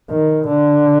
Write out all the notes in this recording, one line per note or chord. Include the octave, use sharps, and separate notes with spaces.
D#3
D3